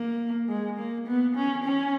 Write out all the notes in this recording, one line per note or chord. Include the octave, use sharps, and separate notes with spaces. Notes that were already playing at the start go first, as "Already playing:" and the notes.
Already playing: A#3
G#3
A#3
B3
C#4
C#4